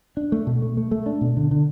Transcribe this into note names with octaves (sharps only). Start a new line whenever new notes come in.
D4
A3
B2
A3
A3
A3
D4
B2
D3
D3